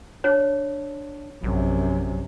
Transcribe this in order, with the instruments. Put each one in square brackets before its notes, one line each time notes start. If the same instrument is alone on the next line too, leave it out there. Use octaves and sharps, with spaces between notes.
[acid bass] D4 [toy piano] C#5
[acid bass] A#1 [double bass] F#2 C3